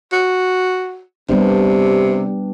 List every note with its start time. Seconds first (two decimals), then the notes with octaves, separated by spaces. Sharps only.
0.13 F#4
1.29 C3 G3 B3 D4